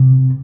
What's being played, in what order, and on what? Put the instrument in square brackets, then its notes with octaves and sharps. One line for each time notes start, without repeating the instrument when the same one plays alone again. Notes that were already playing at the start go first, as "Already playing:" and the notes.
Already playing: [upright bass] C3